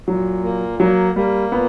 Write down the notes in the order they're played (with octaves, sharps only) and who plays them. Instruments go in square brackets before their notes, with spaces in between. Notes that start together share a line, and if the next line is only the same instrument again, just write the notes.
[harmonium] A#2 [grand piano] F#3
[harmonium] A#3
[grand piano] F#3 [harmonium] A#3
[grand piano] G3 [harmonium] A#3
[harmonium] A#2 [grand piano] B3